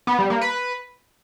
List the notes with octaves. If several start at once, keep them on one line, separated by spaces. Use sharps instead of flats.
B3
G3
A#3
B4